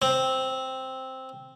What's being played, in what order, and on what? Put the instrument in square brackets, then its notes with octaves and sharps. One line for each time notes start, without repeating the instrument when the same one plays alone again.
[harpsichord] C4